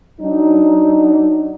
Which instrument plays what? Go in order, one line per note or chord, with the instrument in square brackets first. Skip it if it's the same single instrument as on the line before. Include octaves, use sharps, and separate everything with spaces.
[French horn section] F#3 D4 D#4